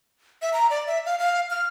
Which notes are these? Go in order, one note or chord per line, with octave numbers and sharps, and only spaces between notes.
E5
A#5
D5
E5
F5
F5
F6